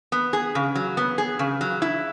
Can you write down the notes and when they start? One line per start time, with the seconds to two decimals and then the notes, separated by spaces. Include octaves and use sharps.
0.12 B3
0.33 G#4
0.55 C#3
0.75 F#3
0.97 B3
1.18 G#4
1.39 C#3
1.61 F#3
1.82 E4